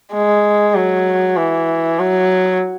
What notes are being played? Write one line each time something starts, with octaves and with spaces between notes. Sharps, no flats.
G#3
F#3
E3
F#3